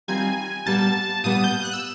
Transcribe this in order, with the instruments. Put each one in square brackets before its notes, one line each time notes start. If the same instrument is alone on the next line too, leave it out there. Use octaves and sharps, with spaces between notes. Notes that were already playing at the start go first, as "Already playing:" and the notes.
[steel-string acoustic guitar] D#3 G3 C4 F4 [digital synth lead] G#5
[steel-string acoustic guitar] A#2 G3 B3 [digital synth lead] A5
[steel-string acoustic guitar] A#2 G3 B3 [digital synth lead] D#6
[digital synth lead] G6
G6
F#6
E6